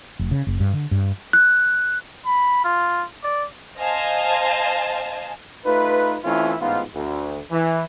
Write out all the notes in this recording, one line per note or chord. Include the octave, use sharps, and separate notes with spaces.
F1
C#3
F#1
G2
D3
G2
F#6
B5
F4
D5
C5 D#5 F5 G#5 A5
A3 D#4 F4 B4
E3 A3 C4 C#4 E4 F4
A1 G#2 B3 D#4 F4
D2
E3